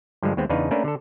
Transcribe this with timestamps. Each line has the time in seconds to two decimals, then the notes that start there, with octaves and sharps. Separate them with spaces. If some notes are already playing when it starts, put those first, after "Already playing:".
0.23 G2 D3 F3 G#3
0.37 D#2 G#3 B3 C4
0.49 E2 C#3 D4 D#4 B4 F5
0.71 A3 A#3 C#4 D4 A#4 B4
0.84 D3 A4